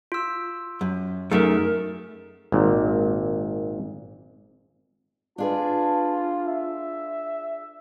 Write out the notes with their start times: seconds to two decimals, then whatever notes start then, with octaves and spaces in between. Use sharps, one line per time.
0.12 F4 E6
0.81 F#2
1.31 F#2 A3 D#4 G#4 A#4
2.52 G#1 A#2
5.38 D4 F4 G#4 B4 A5
6.47 E5